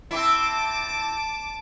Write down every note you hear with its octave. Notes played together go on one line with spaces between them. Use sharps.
C4 E4 A5 D6